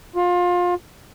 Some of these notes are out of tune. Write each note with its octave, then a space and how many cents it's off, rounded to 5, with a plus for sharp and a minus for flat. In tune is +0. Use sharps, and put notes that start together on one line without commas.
F4 +25